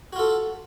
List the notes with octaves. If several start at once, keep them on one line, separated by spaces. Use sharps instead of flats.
F4 F#4 A4